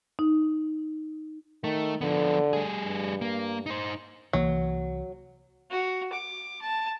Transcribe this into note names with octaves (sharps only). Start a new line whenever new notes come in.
D#4
D#3 A3
D3 F3 B3
G3 G#4
G2
A#3
D#4 C5
C2 E3 F#3 A#3
F#4
D6
A5